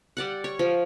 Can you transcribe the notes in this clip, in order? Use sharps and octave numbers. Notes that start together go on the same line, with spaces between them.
G3 D5 F#5
C#5
F3